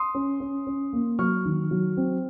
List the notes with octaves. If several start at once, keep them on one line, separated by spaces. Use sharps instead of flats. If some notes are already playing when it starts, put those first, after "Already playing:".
Already playing: C6 D#6
C#4
C#4
C#4
A#3
F#3 C#6 F6
D#3
F#3
C4